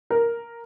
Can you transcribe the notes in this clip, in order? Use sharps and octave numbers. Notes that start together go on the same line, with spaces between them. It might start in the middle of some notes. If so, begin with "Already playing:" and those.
A#4